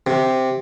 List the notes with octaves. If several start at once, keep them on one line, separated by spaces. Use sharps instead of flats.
C3